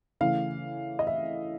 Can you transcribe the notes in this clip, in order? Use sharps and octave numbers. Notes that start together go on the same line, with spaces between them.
C#3 E3 A3 F5
D#5
E5